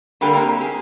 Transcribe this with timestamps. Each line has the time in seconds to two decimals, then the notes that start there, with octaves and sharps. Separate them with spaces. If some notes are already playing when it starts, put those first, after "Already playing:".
0.21 D3 G3 A#3 G4 A#4
0.37 A#3 C4
0.60 G4 G#4